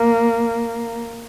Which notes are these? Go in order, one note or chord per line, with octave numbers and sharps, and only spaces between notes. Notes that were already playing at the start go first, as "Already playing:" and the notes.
Already playing: A#3